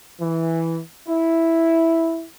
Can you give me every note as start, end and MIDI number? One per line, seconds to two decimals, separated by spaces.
0.20 0.81 52
1.08 2.26 64